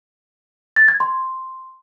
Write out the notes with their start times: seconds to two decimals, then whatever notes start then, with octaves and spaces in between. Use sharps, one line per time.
0.76 A6
0.88 G#6
1.00 C6